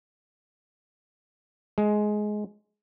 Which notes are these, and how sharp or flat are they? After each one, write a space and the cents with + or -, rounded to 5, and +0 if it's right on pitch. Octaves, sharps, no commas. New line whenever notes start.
G#3 +15